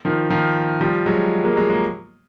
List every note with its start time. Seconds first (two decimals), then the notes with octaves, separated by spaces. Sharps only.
0.05 D#3 F3
0.30 D#3 F3
0.81 F3 G3
1.06 F#3 G#3
1.44 G#3 A#3
1.56 F#3 G#3
1.69 G#3 A#3